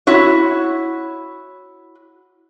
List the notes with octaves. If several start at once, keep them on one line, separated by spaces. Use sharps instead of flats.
E4 F#4 C#5